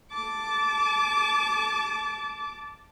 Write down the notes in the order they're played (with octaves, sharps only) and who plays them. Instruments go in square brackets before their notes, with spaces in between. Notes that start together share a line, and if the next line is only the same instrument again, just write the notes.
[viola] A5 D6